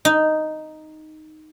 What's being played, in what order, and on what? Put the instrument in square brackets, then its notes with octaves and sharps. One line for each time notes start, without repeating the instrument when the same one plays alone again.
[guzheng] D#4